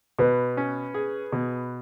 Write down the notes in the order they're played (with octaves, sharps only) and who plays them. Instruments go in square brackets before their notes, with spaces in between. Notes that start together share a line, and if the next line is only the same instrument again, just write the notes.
[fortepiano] B2 [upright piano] B4
[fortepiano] C#4
G#4
B2